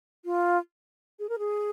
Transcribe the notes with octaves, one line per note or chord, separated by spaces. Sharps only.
F4
G#4
A#4
G#4